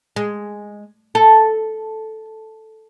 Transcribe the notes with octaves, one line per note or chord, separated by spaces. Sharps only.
G#3
A4